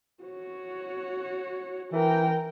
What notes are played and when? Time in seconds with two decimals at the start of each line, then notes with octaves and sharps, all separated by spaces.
0.23 F#4 C#5
1.92 E3 A#4 G5